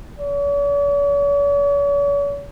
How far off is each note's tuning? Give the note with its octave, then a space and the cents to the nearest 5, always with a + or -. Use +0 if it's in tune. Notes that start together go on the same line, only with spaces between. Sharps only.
C#5 +45